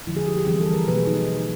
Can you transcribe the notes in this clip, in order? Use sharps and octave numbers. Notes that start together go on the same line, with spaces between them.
D3 F3 G#3 E4
G#4
G4
G4
E3 G3 C4 G#4
A4
A#4
B2 F#3 A#3 B4
G#4
D#4